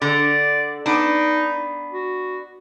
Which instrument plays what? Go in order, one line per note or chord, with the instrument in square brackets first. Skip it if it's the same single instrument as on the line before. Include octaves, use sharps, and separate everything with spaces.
[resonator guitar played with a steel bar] D3 [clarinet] D5
[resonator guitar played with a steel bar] B3 D4 [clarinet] D#4
[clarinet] F#4